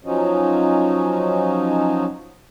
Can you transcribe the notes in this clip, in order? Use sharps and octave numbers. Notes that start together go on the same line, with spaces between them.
F3 F#3 C#4 D#4